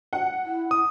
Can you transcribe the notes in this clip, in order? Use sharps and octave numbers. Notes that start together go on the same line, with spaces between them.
F#5
E4
D#6